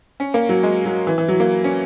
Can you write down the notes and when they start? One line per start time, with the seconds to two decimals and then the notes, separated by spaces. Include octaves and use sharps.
0.20 C#4
0.34 A#3
0.49 F#3
0.63 G#3
0.85 F#3
1.07 E3
1.18 E3
1.28 F#3
1.40 A#3
1.64 C#4